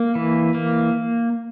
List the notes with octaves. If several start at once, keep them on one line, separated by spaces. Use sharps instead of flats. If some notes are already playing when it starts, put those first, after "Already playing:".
Already playing: A#3
E3
A#3